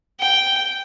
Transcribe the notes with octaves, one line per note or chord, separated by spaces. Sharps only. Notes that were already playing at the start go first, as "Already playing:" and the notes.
G5